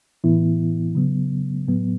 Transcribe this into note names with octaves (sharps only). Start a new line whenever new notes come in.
A2 E3 B3 E4
C#3 F#3 B3
A2 F#3 B3